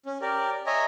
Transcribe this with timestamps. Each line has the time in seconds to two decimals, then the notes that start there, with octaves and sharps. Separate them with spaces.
0.06 C#4
0.21 G4 A#4 D5
0.66 C#5 D#5 E5 G#5 A#5